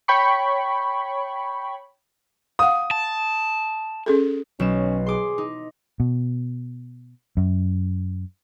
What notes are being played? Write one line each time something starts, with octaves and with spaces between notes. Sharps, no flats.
C#5 G5 B5 C#6
F5 F#5 D#6
A5
C#4 G#4 A4
B1 C#4 E7
G#4 C6 D6
D#4
B2
F#2